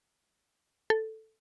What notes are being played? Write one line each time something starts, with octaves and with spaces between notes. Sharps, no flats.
A4